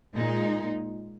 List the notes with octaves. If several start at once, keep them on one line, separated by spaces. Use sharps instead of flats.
A#2 G#3 D#4